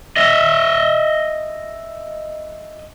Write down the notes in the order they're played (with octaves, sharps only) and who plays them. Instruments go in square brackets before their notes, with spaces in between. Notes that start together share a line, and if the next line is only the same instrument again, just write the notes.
[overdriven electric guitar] D#5 E5